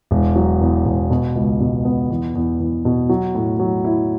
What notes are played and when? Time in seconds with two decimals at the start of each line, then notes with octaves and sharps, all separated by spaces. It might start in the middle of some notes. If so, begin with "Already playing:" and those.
0.11 E1
0.36 F#3
0.61 E2
0.85 E1
1.10 B2
1.35 C#2
1.60 B2
1.85 B3
2.10 E2
2.35 E2
2.60 E2
2.85 B2
3.09 F#3
3.35 A2
3.59 F#3
3.85 E4